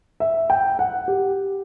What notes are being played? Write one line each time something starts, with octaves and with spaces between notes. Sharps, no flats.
E5
G5
F#5
G4